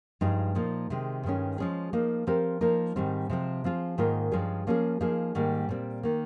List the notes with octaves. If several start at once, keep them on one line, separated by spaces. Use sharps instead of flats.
G2 F3 G#3 D#4 G#4
A#2 F3 A#3 D#4
C3 D#3 G#3
G2 D#3 G#3 C#4
F3 G#3 C#4 G#4
F3 A#3 D#4
F3 C4 G4 A#4
F3 A#3 D#4 A#4
G#2 D#3 G3 C4
C3 F3 G#3 C4
F3 C4 F4 G#4
G#2 D#3 A#3 F4 A#4
G2 F3 G#3 C#4 G#4
F3 A#3 C#4 G#4
F3 A#3 D#4 G#4
G#2 D#3 G3 A#3
A#2 G3 C4
D#3 A#3